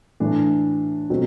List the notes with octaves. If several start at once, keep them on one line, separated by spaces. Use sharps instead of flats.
A2 E3 A3 D4
B2 F#3 A3 C4